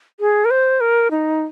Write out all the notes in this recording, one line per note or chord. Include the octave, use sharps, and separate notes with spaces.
G#4
A#4
C5
A#4
D#4